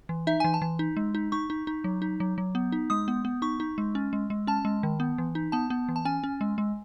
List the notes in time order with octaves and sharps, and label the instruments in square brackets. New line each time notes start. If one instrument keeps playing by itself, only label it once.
[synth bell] E3
D#4 E5
E3 G#5
A5
E3
D#4
G#3
D#4
D#4 C#6
D#4
D#4
F#3
D#4
F#3
F#3
B3
D#4
G#3 D#6
B3
B3
D#4 C#6
D#4
G#3
C#4
G#3
G#3
C#4 A5
G#3
D#3
B3
E3
D#4
B3 A5
B3
E3
A5
C#4 G#5
C#4
G#3
G#3